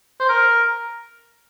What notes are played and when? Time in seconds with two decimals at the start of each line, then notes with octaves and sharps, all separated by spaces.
0.20 C5
0.29 A#4